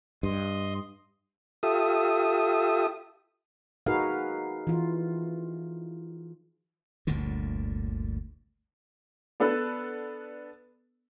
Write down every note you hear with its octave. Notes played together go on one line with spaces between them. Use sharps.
G2 D#5 C6 D#6
F4 G4 A4 E5 D#6
D#4 F#4 G#4 A#4 B4 F5
E3 F4
G1 D2 A#2 D3
B3 D4 A4 B4